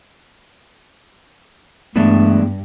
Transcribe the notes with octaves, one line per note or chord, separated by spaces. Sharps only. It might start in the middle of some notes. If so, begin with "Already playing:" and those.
G2 E3 G#3 A3 B3 D4